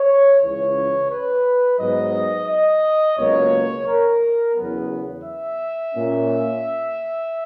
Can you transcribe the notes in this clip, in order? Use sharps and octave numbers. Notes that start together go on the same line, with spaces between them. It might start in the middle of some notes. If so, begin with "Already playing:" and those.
Already playing: C#5
C#2 C#3 E3 C#5
B4
G#2 F#3 B3 D#5
D#5
C#2 B2 F#3 A#3 C#5
A#4
E2 C#3 F#3 B3
E5
A#2 A#3 C#4